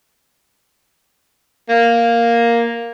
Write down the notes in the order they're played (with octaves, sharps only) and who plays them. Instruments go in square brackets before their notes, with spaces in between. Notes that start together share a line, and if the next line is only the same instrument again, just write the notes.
[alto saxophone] A#3